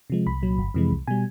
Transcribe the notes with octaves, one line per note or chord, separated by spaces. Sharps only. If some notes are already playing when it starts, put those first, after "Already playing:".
C3 F3 G#3
C2 B5
A#2 F#3
G1
F2 C3 E3 G#3
C2
B2 G3 G#5